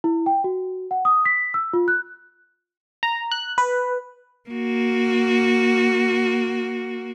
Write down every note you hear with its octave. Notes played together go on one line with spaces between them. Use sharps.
E4
G5
F#4
F#5
D#6
B6
E6
F4
F#6
A#5
F#6
B4
A#3 F#4